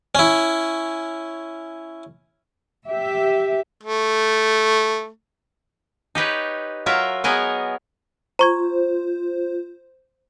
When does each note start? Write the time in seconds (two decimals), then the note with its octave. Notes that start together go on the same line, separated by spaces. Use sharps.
0.15 C#4 E4
2.88 G4 E5
3.83 A3
6.15 D#4 G4 B4 C#5
6.86 F#3 F4 A#4 E5
7.24 F#3 B3 G#4 A#4 D#5 F#5
8.39 F4 C5 A#5 C#6 G#6